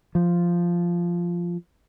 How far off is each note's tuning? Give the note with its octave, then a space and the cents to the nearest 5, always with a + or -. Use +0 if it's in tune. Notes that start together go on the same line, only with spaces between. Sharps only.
F3 -5